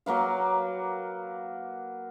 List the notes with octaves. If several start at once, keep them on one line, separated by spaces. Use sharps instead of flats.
F#3 A#3 B4 F5